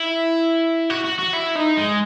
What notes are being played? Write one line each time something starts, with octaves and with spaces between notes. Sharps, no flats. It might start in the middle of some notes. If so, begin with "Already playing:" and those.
Already playing: E4
F#4
F#4
F#4
E4
D#4
G#3